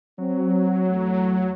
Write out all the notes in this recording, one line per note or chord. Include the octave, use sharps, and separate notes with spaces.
F#3 C4
E2 A3